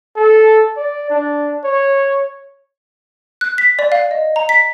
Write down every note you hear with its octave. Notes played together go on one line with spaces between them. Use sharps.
A4
D5
D4
C#5
F#6
B6
D5
F5
D#5
A#5
B6